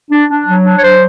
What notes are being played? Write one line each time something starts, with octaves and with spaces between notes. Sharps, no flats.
D4
D4
F#3
D4
C#5
F#3 C5